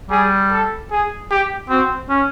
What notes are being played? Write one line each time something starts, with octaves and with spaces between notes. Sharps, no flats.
G3 G#4
A4
G#4
G4
C4 F#4
C#4